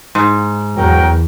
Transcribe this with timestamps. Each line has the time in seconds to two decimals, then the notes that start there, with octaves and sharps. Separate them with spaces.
0.15 G#2
0.76 E2 F#3 A#4 G5